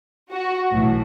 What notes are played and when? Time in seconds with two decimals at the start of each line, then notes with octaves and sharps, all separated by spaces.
0.32 F#4
0.73 B1 A2 E3